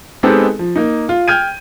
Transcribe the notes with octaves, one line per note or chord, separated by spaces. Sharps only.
G#3 B3 C4 D#4 G4 A4
F3
A#3 D#4
F4
G5 F6 G6 G#6 D#7